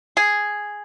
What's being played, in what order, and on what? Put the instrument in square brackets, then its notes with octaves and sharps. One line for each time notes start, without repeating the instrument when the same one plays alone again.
[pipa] G#4